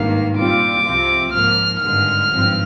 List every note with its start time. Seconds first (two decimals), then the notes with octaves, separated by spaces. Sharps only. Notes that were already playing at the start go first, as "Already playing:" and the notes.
Already playing: G#1 G2 D#3 A#3 F5
0.37 A#2 G3 C4 F4 D6
0.84 C2 C3 F3 C4 F4
1.32 G#2 F3 A#3 F6
1.80 G#1 G2 D3 G#3 F6
2.28 G#1 G2 F3 C4